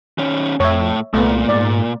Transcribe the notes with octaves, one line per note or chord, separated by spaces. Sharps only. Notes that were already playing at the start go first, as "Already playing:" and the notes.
D#3 C#4
F2 A2 C#5 E5
C2 A#2 A3 B3
G#2 D5